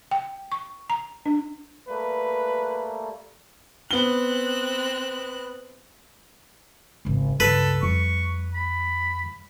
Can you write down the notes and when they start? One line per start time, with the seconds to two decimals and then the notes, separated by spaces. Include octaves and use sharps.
0.11 G5
0.52 C#6
0.90 A#5
1.26 D4
1.88 G3 A3 A#3 B4
3.91 B3 C4 F#6 G7
7.05 G#1 C#2
7.40 C#2 G2 A4 B4
7.83 F2 G3 C#6
8.54 B5